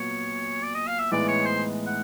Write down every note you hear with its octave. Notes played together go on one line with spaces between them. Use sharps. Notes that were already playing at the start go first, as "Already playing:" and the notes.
Already playing: A#2 F#3 B3 C#5
D5
D#5
F5
E5
A2 E3 G#3 B3 D#4 D5
C#5
C5
F#5